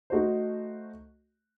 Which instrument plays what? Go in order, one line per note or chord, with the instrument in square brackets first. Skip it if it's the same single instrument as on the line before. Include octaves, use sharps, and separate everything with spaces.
[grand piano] A3 D#4 F#4 C5